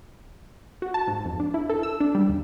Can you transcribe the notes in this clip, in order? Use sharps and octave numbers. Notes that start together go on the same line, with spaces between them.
F#4
A5
G#2
F2
D4
E4
A4
E6
D4
G3
D#2